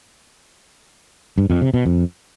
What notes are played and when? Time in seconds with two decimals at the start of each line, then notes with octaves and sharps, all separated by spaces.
1.38 G2
1.50 F2
1.62 C3
1.74 B2
1.86 F2